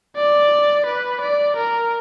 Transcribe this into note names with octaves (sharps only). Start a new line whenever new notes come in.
D5
B4
D5
A#4